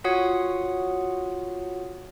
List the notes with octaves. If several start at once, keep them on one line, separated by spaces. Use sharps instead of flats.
F4 F#4 C#5 F#5 D#6 C#7